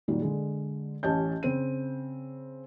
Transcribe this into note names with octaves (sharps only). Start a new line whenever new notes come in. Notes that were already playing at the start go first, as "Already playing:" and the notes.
A#2 D#3 F#3 G3
D3 G#3
A1 C#4 G4 D#5 A5 G6
C#3 C4 D#7